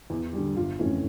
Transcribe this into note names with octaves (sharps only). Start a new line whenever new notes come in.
E2
D3 G3
G1 F4
F2 E3 A3 C#4